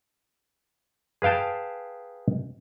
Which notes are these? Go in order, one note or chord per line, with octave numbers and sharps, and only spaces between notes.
G#4 B4 F5 G5 A5